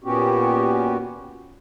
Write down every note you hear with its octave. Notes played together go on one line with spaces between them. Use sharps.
A#2 B3 C#4 F#4 G4